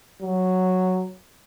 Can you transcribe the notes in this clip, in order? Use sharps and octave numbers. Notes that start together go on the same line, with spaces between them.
F#3